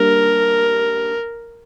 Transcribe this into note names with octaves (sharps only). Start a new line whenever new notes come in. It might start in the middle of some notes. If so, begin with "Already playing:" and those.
Already playing: G3 A#3 D4 A#4